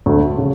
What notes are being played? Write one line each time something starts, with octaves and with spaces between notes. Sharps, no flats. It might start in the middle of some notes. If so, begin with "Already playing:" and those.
D2
C#3